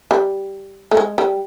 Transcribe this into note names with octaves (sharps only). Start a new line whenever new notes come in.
G3
A3
G#3
G3